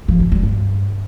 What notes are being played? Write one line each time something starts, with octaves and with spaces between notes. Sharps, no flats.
F3
D3
G3
G2